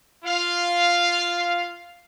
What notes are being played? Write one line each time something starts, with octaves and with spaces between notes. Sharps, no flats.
F4 F5